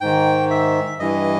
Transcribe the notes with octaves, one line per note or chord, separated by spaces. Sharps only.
G#2 D#3 G5
E5
G2 E3 D#5